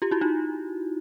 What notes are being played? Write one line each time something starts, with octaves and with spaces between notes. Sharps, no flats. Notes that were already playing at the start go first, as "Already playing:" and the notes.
F4 G4
E4 F#4
D#4 F4